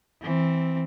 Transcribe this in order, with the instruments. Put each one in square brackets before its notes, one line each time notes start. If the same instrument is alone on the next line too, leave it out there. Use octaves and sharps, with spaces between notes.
[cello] E3 C4